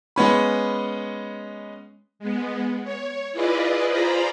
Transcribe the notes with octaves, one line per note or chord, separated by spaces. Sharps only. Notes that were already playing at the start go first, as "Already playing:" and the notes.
G#3 B3 C#4 B5
G#3 B3
C#5
E4 F4 G#4 B4 D5 D#5
F4 G#4 C5 D5 A#5 B5